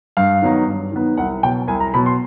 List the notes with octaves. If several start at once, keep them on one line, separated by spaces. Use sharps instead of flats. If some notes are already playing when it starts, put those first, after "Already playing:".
G2 F5
D#3 F#3 B3 D#4
G2
D#3 F#3 B3 D#4
C2 F#5
B2 F#3 G5
C2 G#5
A#5
B2 F#3 B5
C6